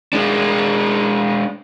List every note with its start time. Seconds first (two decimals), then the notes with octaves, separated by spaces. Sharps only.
0.13 G#3 D4